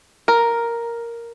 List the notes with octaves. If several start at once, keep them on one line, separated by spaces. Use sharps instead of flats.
A#4